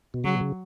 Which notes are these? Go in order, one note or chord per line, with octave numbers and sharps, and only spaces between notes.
B2
C#3 F#3
B2
C#3